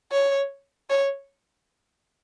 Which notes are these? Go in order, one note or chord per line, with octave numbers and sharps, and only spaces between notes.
C#5
C#5